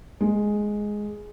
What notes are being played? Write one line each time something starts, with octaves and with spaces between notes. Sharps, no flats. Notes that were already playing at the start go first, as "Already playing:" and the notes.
G#3